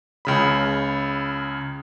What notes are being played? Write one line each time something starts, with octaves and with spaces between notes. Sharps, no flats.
C#2 C#3 B5